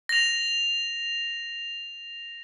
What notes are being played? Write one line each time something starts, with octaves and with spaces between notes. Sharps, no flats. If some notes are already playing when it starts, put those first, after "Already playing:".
A#6 F7